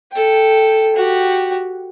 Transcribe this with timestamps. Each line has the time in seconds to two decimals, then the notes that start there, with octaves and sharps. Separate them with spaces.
0.12 A4 G5
0.96 F#4 G4